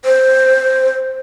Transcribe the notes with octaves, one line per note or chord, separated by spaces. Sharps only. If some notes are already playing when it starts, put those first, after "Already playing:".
C5